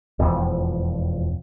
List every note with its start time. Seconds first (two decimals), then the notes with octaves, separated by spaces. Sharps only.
0.19 E1 F2 F3